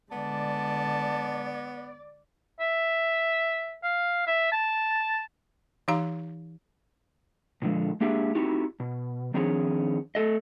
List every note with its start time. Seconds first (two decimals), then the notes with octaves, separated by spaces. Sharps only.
0.12 D3 G#3 B3 D5 A5
2.60 E5
3.84 F5
4.27 E5
4.52 A5
5.88 E3 D#4 G4 F5 A#5
7.62 A#2 D3 F3 G3 G#3
8.01 G#3 A#3 D4 G4 G#4 E5
8.35 C4 D#4 E4 F#4 G4
8.80 B2
9.34 D#3 F3 C4 D4 G#4 C#5
10.15 A3 A4 D#5